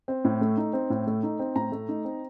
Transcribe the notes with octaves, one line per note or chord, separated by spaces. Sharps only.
C4
A2
A3
D#4
C4
A2
A3
D#4
C4
A2 A#5
A3
D#4
C4